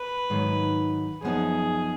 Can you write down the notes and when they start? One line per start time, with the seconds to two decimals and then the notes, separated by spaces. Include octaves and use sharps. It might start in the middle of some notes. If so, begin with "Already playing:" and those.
Already playing: B4
0.30 G#2 D#3 F#3
1.22 F#2 F3 B3 D#4 G#4